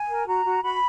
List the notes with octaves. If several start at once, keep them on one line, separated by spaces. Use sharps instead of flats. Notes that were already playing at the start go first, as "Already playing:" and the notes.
Already playing: G#5
A#4
F#4 A#5
F#4
F#4 B5